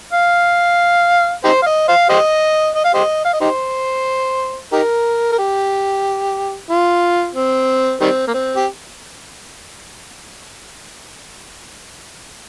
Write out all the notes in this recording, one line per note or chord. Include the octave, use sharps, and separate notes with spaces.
F5
D#4 G4 C5
F5
D#5
C5 F5
G4 C5 D#5
D#5
F5
G4 C5 D#5
F5
D#5
D#4 G4 C5
D#4 G4 A#4
A#4
G4
F4
C4
D#3 G3 C4
A#3
C4
G4